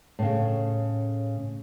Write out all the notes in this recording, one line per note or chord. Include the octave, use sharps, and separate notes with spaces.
A2 C#3